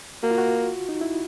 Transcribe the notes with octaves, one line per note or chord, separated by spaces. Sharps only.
A#3 F#4
F4
F#4
D#4
E4